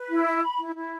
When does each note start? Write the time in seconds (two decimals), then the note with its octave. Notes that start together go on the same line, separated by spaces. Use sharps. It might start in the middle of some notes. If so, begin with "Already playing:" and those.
Already playing: B4
0.08 E4
0.25 E5
0.42 B5
0.59 E4
0.76 E4